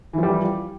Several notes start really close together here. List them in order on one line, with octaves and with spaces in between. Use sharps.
E3 F3 G3